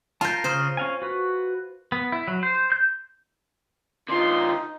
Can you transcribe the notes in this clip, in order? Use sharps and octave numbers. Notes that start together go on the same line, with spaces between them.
F4 A#4 A5 G6
C#3 G#4 C5 F6
C#4 F5 G#5
F#4 B4
B3
E4
F#3
C5
G6
D3 D#4 F4 C6